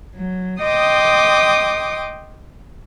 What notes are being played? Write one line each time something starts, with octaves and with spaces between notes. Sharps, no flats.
F#3
D#5 G5 C6 D6 D#6